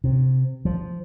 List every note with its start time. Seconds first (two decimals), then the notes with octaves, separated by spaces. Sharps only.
0.04 C3
0.65 F3